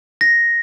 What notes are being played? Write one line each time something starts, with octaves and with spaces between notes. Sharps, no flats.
A#6